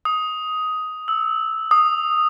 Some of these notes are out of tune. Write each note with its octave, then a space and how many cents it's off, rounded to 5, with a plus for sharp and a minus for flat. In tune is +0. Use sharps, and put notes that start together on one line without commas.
D#6 +10
E6 -10
D#6 -10